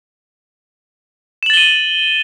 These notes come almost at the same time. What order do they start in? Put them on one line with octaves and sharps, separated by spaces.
E7 F#7 A6 G7 D#7